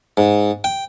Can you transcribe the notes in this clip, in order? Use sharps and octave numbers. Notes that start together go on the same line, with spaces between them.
G#2
G5